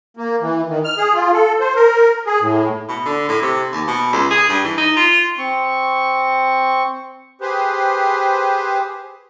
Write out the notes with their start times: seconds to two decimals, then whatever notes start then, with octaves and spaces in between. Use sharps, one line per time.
0.17 A#3
0.41 E3
0.69 D#3
0.84 F6
0.98 G#4
1.14 F4
1.33 A4
1.60 C5
1.75 A#4
2.26 G#4
2.41 A2
2.89 B2
3.06 D3
3.29 A2
3.42 C3
3.72 D#2
3.88 B2
4.12 C#2
4.31 G#4
4.49 G2
4.64 E3
4.78 D#4
4.96 F4
5.38 C4 C#6
7.41 G4 G#4 B4 C5